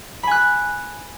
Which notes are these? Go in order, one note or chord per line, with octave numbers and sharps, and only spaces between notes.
G#5 B5 F#6